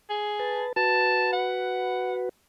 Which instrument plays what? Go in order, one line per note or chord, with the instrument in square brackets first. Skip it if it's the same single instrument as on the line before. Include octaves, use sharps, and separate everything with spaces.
[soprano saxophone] G#4
[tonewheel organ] B4 A5
[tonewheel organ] F#4 B4 [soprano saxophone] A5
[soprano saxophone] F#5